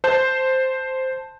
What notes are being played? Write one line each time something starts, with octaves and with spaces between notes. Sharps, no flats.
C5 A5 G6